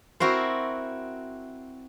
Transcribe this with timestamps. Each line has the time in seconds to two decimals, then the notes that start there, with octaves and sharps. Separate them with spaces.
0.20 C4 E4 F#4 A#4 C5